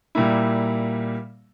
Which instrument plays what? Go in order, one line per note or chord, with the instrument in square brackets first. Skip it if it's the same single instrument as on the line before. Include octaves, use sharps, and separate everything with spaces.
[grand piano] A#2 G3 A#3 E4